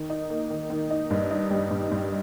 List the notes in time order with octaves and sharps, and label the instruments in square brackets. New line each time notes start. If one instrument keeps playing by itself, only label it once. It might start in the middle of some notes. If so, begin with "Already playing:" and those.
Already playing: [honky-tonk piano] D#3
D#4
A#3
D#3
D#3
D#4
G2
D#4
G3
G2
G2